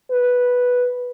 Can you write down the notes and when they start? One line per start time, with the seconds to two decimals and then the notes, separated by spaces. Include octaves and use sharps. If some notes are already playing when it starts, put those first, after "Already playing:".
0.11 B4